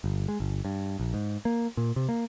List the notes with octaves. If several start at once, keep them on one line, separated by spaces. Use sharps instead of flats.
G1
G#3
G1
G2
A#1
G#2
A#3
A#2
C3
A#3